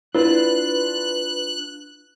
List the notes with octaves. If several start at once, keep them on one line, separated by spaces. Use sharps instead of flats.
D4 E4 F4 B4 F#6